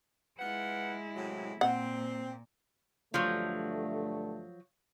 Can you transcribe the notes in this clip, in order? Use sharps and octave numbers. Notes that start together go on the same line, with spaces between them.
G#3 E4 F4 B4 F#5
A2 C3 F#3
A#2 C4 F#5
G2 D3 F3 F#3 A3